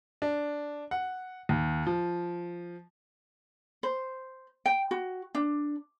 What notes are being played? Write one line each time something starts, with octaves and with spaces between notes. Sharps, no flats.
D4
F#5
D#2
F3
C5
G5
F#4
D4